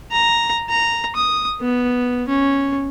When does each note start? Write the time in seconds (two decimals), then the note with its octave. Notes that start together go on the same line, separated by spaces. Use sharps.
0.11 A#5
0.69 A#5
1.16 D#6
1.61 B3
2.28 C#4